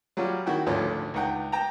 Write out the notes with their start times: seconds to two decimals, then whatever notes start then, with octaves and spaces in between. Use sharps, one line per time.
0.17 F#3 G3 C#4 F4
0.46 D#3 E4 F#4 G5
0.67 G#1 D2 D3 F3 C#4
1.14 C#2 D#4 F#5 G5
1.52 G5 A5 A#5